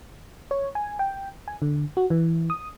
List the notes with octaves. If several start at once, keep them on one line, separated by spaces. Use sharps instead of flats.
C#5
G#5
G5
G#5
D3
F#4
E3
D#6